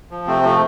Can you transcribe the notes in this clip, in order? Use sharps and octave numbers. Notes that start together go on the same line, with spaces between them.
F3
C3 A3 C4
F3 A3